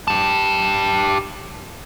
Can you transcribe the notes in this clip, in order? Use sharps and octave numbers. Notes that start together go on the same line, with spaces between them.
G4 A5